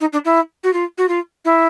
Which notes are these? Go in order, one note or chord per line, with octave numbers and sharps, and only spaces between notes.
D#4
D4
E4
F#4
F4
F#4
F4
E4